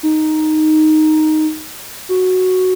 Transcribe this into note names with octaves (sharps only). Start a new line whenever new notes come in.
D#4
F#4